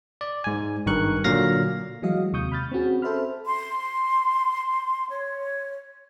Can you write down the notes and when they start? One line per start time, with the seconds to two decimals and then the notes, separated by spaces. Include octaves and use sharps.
0.21 D5
0.44 G#2 G#5
0.86 G#1 G2 D#3 A#4 C#6 F#6
1.24 A#2 D3 F#3 F5 A#6
2.02 E3 F#3 G#3 F#4 D#5 F5
2.33 D#2 C3 C#6 D#6 G6
2.52 B5 F6 G6 A6
2.71 C4 C#4 F#4 G#4
3.02 A4 C5 E5 B5 F6
3.46 C6
5.10 C#5